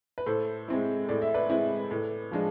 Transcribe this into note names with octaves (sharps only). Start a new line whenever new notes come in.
B4
A2 A4 C5
G#3 C4 E4
A2 D5
E5
B4 D5
G#3 C4 E4
A2
F3 G#3 D4